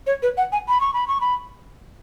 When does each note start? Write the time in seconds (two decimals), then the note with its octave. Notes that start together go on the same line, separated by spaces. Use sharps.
0.07 C#5
0.23 B4
0.37 F#5
0.52 G#5
0.68 B5
0.81 C#6
0.94 B5
1.08 C#6
1.21 B5